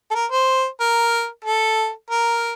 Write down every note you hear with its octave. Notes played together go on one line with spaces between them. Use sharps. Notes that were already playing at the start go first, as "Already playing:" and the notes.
A4
A#4
C5
A#4
A4
A#4